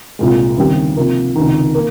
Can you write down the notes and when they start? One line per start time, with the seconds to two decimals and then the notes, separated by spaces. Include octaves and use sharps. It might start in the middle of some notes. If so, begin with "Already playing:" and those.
0.19 C2 A#2 G#3
0.58 D#2 C#3 G3 C4 G4
0.97 C3 F3 A#3
1.36 C#2 C3 D#3
1.75 A#3